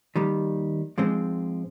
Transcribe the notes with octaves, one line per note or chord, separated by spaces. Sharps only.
D#2 D#3 G3
G#2 F3 G#3 C4